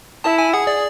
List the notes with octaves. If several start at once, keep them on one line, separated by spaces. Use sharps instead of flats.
E4 A5
G#5
G#4 F#5
D5